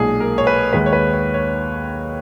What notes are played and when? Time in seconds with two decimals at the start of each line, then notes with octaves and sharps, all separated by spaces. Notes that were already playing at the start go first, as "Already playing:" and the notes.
Already playing: B1 A#2 G#3 G#4
0.20 A#4
0.38 C#5
0.47 B4
0.73 D#2 D#3 G#3 B4
0.86 C#5
0.93 B4
1.13 C#5
1.34 C#5